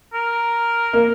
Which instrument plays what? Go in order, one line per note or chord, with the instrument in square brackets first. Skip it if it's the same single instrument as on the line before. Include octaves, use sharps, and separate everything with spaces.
[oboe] A#4
[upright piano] A#3